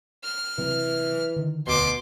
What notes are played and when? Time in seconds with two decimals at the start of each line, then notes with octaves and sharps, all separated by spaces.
0.24 F6
0.58 C3 E3 F#3 C4
1.36 D3 D#3
1.67 E1 D2 B2 C6 D6